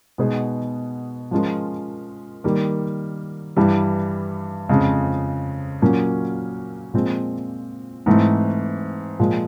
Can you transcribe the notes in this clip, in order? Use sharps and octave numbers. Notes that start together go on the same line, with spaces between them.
B2 G#3 B3 D#4 G#4
F3 G#3 C#4 F4 A#4
D#3 G3 A#3
G2 E3 G3
F2 C#3 F3 G#3 C4
A#2 F#3 A#3 C#4 F#4
A#2 F3 G#3 C4
G#2 E3 A3 C4
A#2 F3 G#3